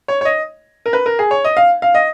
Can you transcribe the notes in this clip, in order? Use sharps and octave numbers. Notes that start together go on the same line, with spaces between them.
C#5
C#5
D#5
A#4
B4
A#4
G#4
C#5
D#5
F5
F5
D#5